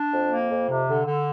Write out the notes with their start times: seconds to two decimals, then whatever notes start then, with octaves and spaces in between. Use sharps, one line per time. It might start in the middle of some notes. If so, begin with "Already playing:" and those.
Already playing: D4
0.11 F2
0.30 A#3
0.50 F2
0.69 C3
0.88 D3
1.07 D3